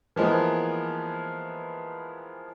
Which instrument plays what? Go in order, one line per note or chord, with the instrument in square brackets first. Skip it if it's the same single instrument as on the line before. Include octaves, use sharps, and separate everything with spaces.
[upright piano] E3 F3 G#3 A#3 B3